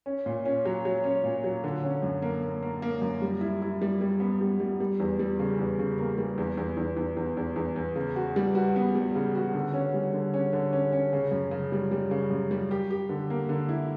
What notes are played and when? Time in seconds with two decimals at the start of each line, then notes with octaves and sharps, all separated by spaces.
0.06 C#4
0.26 A#2
0.45 C#4
0.65 F#3
0.85 F#3
1.04 C#4
1.24 A#2
1.44 F#3
1.64 D3
1.83 C#4
2.03 F#2
2.22 A#3
2.42 A#3
2.63 A#3
2.82 A#3
3.02 F#2
3.22 G3
3.41 E4
3.62 E4
3.81 G3
4.01 G3
4.20 B3
4.41 G3
4.60 G3
4.80 G3
5.00 E2
5.19 G3
5.39 C#3
5.59 E2
5.79 C#3
5.98 A#3
6.18 G3
6.38 E2
6.58 E2
6.77 E2
6.97 E2
7.17 E2
7.37 E2
7.56 E2
7.76 E2
7.96 C#3
8.16 F#4
8.36 G3
8.55 F#4
8.76 B3
8.95 G3
9.15 C#3
9.35 F#4
9.54 D3
9.74 C#4
9.94 G3
10.13 D3
10.34 C#4
10.53 D3
10.73 C#4
10.92 C#4
11.13 C#3
11.32 F#2
11.51 C#3
11.72 G3
11.91 G3
12.11 C#3
12.30 F#2
12.51 G3
12.71 G4
12.91 G4
13.09 D3
13.30 A#3
13.49 D3
13.69 E4